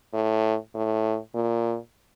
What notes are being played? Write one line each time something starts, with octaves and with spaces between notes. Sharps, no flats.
A2
A2
A#2